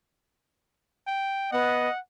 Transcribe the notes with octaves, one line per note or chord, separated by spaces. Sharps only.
G5
B3 D#5 F#5